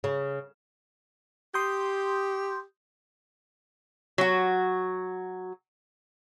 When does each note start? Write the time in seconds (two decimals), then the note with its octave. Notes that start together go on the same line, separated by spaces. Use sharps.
0.04 C#3
1.54 G4 C6 D#6 G6
4.18 F#3 F#4